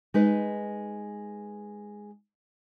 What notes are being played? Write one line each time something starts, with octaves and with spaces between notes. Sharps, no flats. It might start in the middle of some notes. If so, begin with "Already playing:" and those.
G#3 D#4 B4